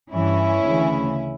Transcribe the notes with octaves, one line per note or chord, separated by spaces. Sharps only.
G2 E3 C#4 E4
D2 C#3 E3